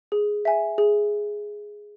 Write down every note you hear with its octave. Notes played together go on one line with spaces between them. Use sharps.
G#4
E5 G#5
G#4